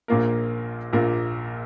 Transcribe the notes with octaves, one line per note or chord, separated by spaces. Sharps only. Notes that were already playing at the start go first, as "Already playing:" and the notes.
A#1 A#2 A#3 F4 A#4
A#1 A#2 A#3 F4 A#4